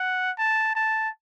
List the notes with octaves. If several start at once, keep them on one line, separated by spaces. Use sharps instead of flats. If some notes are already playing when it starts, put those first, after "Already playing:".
Already playing: F#5
A5
A5